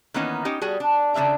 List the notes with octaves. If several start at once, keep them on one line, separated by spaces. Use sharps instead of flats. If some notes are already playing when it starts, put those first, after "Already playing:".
D#3 E3 A#3 B3 C#4 D#4
C#4 D#4 G4
G3 F#4 G#4
D4
C#3 A#3 D4 E5 A#5